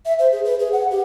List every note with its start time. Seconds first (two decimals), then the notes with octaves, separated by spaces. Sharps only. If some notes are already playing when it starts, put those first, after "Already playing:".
0.05 E5
0.19 C5
0.32 G#4
0.45 B4
0.59 G#4
0.72 F#5
0.91 G4